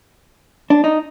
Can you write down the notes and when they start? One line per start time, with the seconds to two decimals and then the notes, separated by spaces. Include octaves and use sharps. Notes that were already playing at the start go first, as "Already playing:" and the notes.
0.70 D4
0.84 D#4